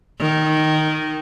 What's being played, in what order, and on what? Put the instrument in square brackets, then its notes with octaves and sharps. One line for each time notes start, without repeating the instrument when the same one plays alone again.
[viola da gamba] D#3